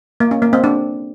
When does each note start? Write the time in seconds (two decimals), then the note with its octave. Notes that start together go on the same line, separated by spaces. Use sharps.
0.20 A#3
0.31 C#4
0.42 A#3
0.53 C4
0.64 D4